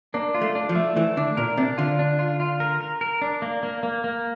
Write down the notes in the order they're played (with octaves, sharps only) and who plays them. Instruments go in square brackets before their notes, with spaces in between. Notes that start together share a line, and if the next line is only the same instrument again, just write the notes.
[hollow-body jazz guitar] A#3 [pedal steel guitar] D4
[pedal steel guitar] F4
[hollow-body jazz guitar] A3
[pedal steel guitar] D4
[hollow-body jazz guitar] F3
[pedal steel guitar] A3
[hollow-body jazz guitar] E3 [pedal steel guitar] A3
[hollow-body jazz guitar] D3 [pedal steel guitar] D4
[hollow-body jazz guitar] A#2 [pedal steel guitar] A#4
[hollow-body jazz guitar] C3 [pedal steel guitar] D4
[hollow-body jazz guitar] D3 [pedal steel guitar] F4
[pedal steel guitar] D4
F4
F4
A#4
A#4
A#4
D4
A#3
A#3
A#3
A#3